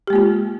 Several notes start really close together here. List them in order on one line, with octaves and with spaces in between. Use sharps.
G4 G#3 A#3 F4